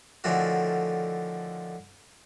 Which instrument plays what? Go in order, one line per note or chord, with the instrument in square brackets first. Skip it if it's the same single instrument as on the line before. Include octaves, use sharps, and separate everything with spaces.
[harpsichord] D3 D#3 F3 A3 C#4 F#4